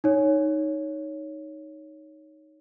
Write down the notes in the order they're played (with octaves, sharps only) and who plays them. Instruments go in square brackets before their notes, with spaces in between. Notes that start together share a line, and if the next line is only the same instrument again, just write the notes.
[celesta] D#4 C#5